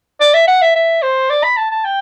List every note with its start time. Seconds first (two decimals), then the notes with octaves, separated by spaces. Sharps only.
0.21 D5
0.34 E5
0.48 F#5
0.62 E5
0.75 E5
1.02 C5
1.30 D5
1.43 B5
1.57 A5
1.70 A5
1.84 G5